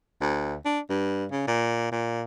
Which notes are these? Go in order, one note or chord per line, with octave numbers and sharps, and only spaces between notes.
D2
D4
G2
C#3
A#2
A#2